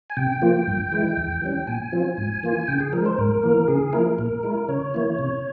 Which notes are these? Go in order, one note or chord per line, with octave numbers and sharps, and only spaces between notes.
G#5
C3 G5
F3 A#3 F4
G2
E3 G#3 E4
E2
E3 G3 C#4
A#2 G#5
F3 C4 F4
G#2
E3 A#3 F4
C#3 G5
G#4
F3 G#3 A#4
C5
G#2 A#4
E3 A#3
C#3 G#4
F3 A#3 E4 A#4
A#2 A#4
G#3 E4
C#3 C#5
E3 A#3 E4
C3